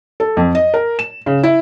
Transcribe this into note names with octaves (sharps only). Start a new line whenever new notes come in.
A4
F2
D#5
A#4
E7
C#3
E4